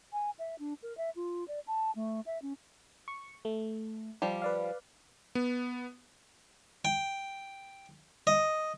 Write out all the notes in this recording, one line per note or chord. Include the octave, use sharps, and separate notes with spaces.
G#5
E5
D4
A#4
E5
F4
D5
A5
A3
E5
C#4
C#6
A3
F3 G3
B4 D5 F5
B3
G5
D#5